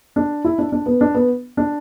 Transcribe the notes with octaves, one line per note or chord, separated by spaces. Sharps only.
D4
E4
D4
D4
B3
D4
B3
D4